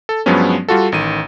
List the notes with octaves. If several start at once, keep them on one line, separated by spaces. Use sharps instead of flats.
A4
G2 F3 F#3 G#3 B3 C#4
G3 F4 F#4 A4
A1 D#3 D#7